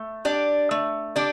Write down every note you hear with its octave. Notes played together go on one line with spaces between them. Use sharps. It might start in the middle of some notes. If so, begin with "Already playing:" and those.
Already playing: A3
D4 G4 D5
A3
D4 G4 D5